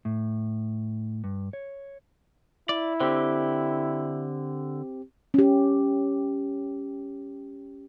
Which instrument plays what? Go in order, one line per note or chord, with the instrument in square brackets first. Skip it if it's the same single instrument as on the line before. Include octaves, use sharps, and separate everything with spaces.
[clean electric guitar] A2
G2
C#5
[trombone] E4 [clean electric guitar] D5
[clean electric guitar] D3 [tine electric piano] C4 G4
[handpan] C#4 G4